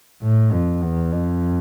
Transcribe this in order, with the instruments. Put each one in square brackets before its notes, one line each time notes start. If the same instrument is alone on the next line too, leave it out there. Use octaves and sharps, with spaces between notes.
[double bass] A2
F2
E2
F2